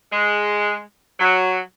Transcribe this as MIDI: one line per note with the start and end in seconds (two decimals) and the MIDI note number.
0.11 0.81 56
1.19 1.59 54